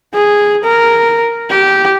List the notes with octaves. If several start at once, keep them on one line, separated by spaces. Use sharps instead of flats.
G#4
A#4
G4